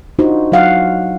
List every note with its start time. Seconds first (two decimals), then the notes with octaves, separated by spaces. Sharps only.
0.19 D4 D#4 F4 F#4 C5
0.52 F#3 F#4 F5 F#5